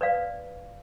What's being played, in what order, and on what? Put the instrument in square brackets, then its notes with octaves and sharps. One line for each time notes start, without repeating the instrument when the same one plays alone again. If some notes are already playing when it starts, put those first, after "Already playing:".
[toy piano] B4 D5 F5